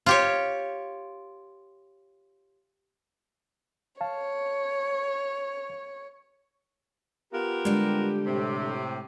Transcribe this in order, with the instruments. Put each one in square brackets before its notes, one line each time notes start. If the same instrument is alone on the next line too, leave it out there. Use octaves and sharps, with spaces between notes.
[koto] F4 G4 C#5
[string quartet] C#5 [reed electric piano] F5 A5
[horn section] B3 F4 A#4 [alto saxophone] G4
[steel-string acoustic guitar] D3 G3 [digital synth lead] G#3
[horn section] A2 C3